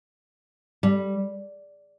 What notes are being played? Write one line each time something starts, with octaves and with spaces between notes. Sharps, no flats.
G3